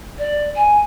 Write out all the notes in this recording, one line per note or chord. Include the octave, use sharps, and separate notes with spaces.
D5
G#5